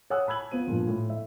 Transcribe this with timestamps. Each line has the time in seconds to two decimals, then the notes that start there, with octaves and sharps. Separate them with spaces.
0.10 C#5 F#5 G#5 D#6 E6 F#6
0.27 A5 B5 E6 G#6 F#7
0.51 B3 F4 C5 D#7
0.67 G2 A#2 F3
0.87 A2
1.10 E5